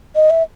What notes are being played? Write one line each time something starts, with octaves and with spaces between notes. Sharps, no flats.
D#5
E5